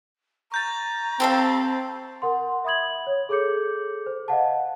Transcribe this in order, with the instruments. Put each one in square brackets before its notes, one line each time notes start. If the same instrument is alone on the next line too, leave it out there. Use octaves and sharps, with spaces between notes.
[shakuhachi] A#5 [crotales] C#6 G6 A6
[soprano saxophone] C4 [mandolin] G4 A4 F5
[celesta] A#4 F#5 C6
E5 B5 D#6 G#6 F#7
C#5
G#4 A4 D6 G6 C#7
C5
D#5 F5 F#5 A5